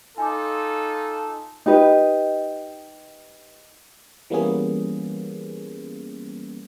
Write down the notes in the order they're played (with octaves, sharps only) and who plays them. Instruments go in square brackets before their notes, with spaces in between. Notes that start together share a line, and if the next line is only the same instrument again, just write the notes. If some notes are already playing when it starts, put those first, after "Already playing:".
[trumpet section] D#4 F4 A4 [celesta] G#5 D6
[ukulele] D#4 G4 B4 D#5
[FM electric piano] E3 G3 A#3 B3 C#4 G#4